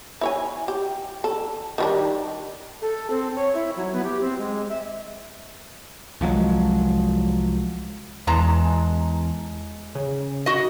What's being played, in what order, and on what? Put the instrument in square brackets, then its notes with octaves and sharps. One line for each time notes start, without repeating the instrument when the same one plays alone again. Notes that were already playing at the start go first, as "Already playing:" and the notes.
[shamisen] E4 C#5 G#5
G4
A4
D#3 G3 D4
[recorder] A4
C4
C#5
E4
F#3
B3
G4
C4
G#3
E5
[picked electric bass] C2 F3 F#3 G#3
[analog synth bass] E2 [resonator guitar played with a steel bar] G#3 A5 A#5
[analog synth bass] C#3
[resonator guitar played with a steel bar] F#4 D#5